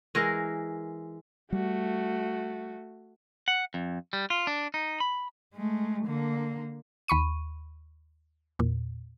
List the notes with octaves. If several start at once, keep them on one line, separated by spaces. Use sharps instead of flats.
E3 G#3 A#4
G3 A3 F#4
F#5
F2
G3
F4
D4
D#4
B5
G#3 A3
D3 A#3
D#2 B5 C#6 D#7
E2 A#2